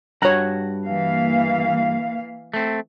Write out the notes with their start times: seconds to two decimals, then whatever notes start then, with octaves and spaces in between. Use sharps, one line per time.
0.22 G2 F#4 C#5 F#5 A#5
0.86 E3 A#3 F5
2.54 A3 C4